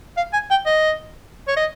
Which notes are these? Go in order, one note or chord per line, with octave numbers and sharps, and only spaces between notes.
F5
G#5
G5
D#5
C#5
D#5